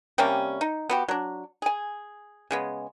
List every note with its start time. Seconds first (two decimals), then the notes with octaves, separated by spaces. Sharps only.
0.18 C3 G3 A#3 C#4
0.61 D#4
0.89 B3 F#4 G4
1.08 F#3 D4
1.62 G#4 G#5
2.51 C#3 G#3 B3